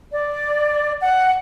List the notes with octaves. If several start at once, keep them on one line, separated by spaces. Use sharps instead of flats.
D5
F#5